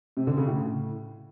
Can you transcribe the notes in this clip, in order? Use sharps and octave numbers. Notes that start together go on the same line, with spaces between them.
C3
D3
C#3
A2